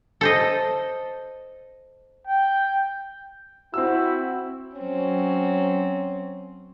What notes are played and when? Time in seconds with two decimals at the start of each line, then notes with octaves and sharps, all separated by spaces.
0.21 A4 C5 D#5
2.27 G5
3.74 C4 E4 F#4 E6
4.77 F#3 C4 C#4